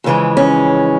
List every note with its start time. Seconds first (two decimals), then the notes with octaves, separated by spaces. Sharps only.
0.04 F2 C#3 E3 G#3
0.37 C#4